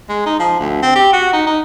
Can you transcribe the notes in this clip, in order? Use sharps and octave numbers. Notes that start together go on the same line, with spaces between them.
G#3
D#4
F3
D2
C4
G4
F#4
D#4
D#4